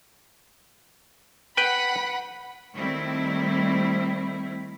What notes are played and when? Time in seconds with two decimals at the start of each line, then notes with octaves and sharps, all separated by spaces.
1.57 B4 F#5 G5 B5
2.75 D#3 G3 A3 C4 E4